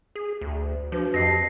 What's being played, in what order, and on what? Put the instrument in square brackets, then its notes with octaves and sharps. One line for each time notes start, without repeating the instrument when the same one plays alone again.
[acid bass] G#4
D2
[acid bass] F3 [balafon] D4 F#4 B4
[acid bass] F2 [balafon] G4 D#5 A5 [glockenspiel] A#6 C7